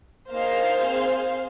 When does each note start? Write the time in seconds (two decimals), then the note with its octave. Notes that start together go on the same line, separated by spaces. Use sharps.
0.29 A#3 D#4 G#4 C5 F5
0.75 C4 G#4